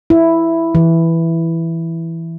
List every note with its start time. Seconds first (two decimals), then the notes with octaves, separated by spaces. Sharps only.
0.10 E4
0.75 E3